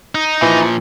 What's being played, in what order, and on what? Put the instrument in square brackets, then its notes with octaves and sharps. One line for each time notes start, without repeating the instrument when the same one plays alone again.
[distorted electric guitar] D#4
[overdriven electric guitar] A#2 F3 [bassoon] E3